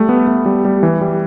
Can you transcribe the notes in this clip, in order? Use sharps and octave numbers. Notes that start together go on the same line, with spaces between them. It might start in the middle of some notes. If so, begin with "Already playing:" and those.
Already playing: G3 A3
B3
A3
G3
G3
E3
G3